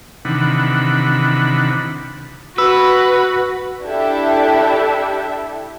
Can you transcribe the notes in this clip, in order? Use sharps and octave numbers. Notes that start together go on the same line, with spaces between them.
C3 D#3 E3 D4 F#5 B5
F#4 B4 E6
D4 E4 G4 A4 E5